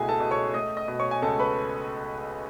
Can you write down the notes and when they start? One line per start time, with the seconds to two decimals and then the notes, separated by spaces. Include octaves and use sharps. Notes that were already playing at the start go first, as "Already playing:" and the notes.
Already playing: C#2 B2 A3 E4 G#4 G#5
0.09 A4 A5
0.20 B2
0.31 C#5 C#6
0.54 A3 D#5 D#6
0.77 D#5 D#6
0.88 B2
0.99 C#5 C#6
1.11 G#5
1.22 C#2 A4 A5
1.39 B4 B5